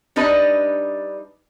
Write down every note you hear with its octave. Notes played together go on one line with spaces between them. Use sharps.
G3 D4 D#4 B4 D5 D#5